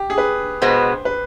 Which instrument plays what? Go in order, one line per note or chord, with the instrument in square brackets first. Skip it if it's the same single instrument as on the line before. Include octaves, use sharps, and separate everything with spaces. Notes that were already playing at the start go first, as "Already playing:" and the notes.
Already playing: [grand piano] G4
G#4
B4
[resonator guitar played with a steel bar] B2 G#3 B3 [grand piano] C5
[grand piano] B4